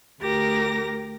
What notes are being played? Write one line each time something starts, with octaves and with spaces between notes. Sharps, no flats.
D2 G4 A#4 A#6